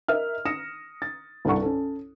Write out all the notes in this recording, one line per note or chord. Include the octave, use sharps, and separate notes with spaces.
A#4 D#5 E5 F6
D#6 A#6 C#7 E7
A6
C2 G2 A4 F#5 C#6
C#4 A4